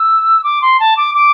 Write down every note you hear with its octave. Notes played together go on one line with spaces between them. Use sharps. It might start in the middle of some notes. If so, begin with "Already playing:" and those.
Already playing: E6
D6
C6
A5
D6
D6